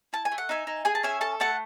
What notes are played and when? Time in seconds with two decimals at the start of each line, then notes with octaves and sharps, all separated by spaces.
0.13 E4 A5
0.25 G#5
0.32 A3
0.38 F#5
0.49 D#4 E5 G#5
0.67 D#4
0.85 G#4 G#5
0.95 A5
1.03 C#4 E5 G#5
1.21 A4 A5
1.40 A3 F#5 A5